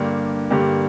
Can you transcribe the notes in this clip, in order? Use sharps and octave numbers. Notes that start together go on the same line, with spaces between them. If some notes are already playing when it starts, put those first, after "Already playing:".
Already playing: G2 D3 A#3 D4 G4
G2 D3 A#3 D4 G4